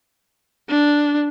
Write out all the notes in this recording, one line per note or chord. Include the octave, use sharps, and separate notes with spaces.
D4